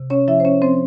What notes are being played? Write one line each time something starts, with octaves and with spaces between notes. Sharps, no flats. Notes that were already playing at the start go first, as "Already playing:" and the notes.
Already playing: C3
C#4 C#5
F3 E4 E5
C5
C#4 C#5
F3 C4 C5